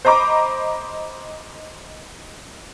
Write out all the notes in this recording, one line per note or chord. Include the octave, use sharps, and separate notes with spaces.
C5 D#5 A#5 B5 D6